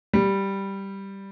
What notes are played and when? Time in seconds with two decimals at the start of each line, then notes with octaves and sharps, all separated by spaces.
0.13 G3